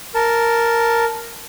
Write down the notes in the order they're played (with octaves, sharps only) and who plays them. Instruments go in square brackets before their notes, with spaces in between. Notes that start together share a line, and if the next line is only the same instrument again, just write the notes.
[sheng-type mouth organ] A#4 A5